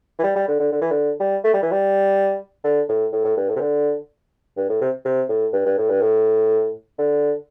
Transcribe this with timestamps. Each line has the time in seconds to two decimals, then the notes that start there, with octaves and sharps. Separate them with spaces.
0.19 E3
0.23 G3
0.36 G3
0.48 D3
0.60 D3
0.72 D3
0.81 E3
0.91 D3
1.20 G3
1.44 A3
1.54 G3
1.63 E3
1.71 G3
2.64 D3
2.89 A2
3.12 A2
3.25 A2
3.37 G2
3.49 A2
3.56 C3
3.61 D3
4.57 G2
4.69 A2
4.81 C3
5.05 C3
5.29 A2
5.53 G2
5.66 G2
5.78 A2
5.90 G2
6.01 A2
6.99 D3